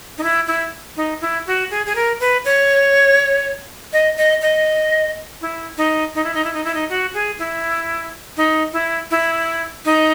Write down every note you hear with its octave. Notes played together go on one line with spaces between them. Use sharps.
D#4
E4
E4
D#4
E4
F#4
G#4
G#4
A#4
B4
C#5
D#5
D#5
D#5
E4
D#4
D#4
E4
D#4
E4
D#4
E4
D#4
F#4
G#4
E4
D#4
E4
E4
D#4